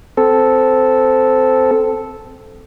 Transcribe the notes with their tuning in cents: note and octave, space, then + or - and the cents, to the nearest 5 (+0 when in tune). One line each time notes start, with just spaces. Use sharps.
C4 -10 A4 -5